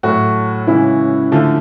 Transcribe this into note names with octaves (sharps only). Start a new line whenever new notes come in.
A2 F#3 A3 F#4
C#3 E3 G#3 E4
D3 F3 A3